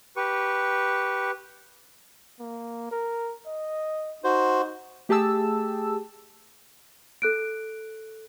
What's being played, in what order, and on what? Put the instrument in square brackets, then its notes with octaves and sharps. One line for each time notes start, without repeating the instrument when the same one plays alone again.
[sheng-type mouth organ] G4 B4 C#6
[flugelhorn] A#3
A#4
D#5
[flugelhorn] D#4 [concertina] F#4 C5
[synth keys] A3 G4 G#4 A5 E6
[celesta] A4 F#6 D7